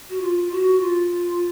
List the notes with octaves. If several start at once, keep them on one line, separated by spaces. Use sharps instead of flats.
F#4
F4
F#4
F4